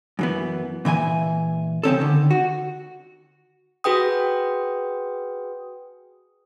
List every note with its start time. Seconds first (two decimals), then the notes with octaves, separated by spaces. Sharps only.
0.19 F#2 E3 B3
0.85 A#2 E3 E5 G#5
1.83 C#3 C4 C#4 A4
2.00 D3 D#3
2.31 F#4
3.84 F#4 G#4 B4 G5 D#6